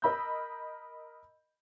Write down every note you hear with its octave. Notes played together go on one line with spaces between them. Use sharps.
A#4 D#5 B5 E6 G6